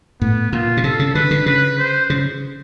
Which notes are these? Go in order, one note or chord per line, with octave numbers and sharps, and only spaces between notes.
A2 B3
A#2 F4
B2
C3 A4
C#3
D3 B4
D3
C#3 B4
C5
C#3